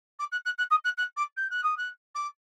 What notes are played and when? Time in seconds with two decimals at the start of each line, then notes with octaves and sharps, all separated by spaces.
0.19 D6
0.32 F#6
0.45 F#6
0.58 F#6
0.71 D#6
0.85 F#6
0.98 F#6
1.17 D6
1.37 G6
1.50 F#6
1.63 D#6
1.77 F#6
2.15 D6